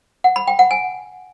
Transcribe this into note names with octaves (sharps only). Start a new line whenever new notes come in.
F#5
B5
G5
F#5
G#5